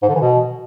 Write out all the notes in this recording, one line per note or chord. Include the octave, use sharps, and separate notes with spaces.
G#2
D3
E3
B2